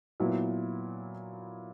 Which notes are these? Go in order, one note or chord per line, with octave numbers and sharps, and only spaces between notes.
A#2 F#3 B3 E4